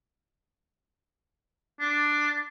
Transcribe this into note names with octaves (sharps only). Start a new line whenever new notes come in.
D4